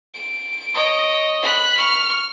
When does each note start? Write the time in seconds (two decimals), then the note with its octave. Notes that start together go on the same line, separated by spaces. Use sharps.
0.15 D7
0.74 C#5 D#5
1.42 B5 F#6
1.78 C#6 F6